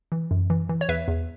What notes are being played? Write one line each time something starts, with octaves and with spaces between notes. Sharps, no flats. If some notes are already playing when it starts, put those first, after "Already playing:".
E3
F#2
E3
E3
C#5
E2 B4 E5
E2